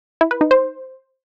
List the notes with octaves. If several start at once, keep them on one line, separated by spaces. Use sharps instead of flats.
E4
B4
D#4
C5